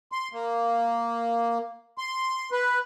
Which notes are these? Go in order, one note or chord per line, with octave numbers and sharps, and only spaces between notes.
C6
A#3
C6
B4